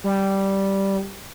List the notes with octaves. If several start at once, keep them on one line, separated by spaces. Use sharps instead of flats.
G3